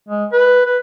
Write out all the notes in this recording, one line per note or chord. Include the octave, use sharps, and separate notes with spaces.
G#3
B4
B4